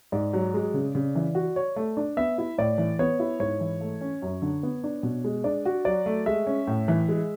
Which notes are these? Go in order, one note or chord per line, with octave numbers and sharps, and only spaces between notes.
G#2 D5
F#3
G#3
C#3
C#3
E3
F#4
C#5
A3
D4
B3 E5
E4
A2 D5
E3
B3 C#5
E4
G#2 C#5
E3
A3
C#4
F#2
D3
B3
D4
B2
G#3
D4 D5
F#4
F#3 D5
A3
G#3 E5
C#4
A2
E3
G#3